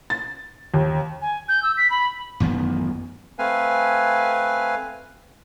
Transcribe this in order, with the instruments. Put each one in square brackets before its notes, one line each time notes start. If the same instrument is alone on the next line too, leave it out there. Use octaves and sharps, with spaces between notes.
[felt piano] A6
D#2
[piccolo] G#5
G6
E6
B6
B5
[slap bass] A1 F#2 D#3 B3
[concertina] A3 C4 B4 F5 G#5